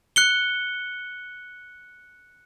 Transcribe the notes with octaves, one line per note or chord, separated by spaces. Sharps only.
F#6 C#7 G7